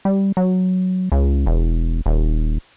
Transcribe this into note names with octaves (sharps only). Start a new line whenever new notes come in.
G3
F#3
C#2
E1
D#1